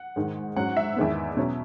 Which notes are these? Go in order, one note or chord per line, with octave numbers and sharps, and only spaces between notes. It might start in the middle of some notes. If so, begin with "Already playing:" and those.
Already playing: F#5
G#2 D#3 G#3
G#2 F#3 C#4 F#5
E5
E2 D#3 G#3 B3
B2 F#3 C#4